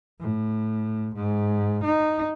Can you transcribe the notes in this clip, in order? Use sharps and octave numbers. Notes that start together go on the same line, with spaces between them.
A2
G#2
D#4